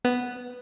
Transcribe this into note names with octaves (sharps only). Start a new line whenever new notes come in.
B3